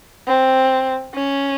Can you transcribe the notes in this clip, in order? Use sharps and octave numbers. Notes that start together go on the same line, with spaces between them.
C4
C#4